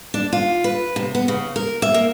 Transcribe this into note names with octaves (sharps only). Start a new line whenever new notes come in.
D4
F4
B4
C3
B3
C#3
A#4
E5
A#3